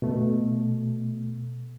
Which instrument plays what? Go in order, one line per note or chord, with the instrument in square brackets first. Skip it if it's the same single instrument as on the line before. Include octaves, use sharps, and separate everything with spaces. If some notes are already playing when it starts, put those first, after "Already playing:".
[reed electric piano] B2 A3